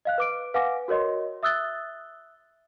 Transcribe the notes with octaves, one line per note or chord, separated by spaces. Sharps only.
D#5 F5 F#6
B4 D6 D7
B4 F5 F#5 G#5 D6 A#6
F#4 A#4 C#5 D#5 C6
E5 D#6 E6 F#6 A6 G7